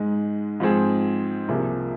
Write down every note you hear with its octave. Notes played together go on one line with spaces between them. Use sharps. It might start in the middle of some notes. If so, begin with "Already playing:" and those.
Already playing: G#2 G#3 D#4
G#2 F3 C4 G#4
C2 C3 F3 A#3 G#4